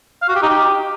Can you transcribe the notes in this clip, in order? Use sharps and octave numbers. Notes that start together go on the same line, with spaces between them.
F5
F#4
G4
D#4
G4